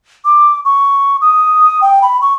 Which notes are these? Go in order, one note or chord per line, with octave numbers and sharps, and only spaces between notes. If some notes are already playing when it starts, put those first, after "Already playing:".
D6
C#6
D#6
G5
B5
C#6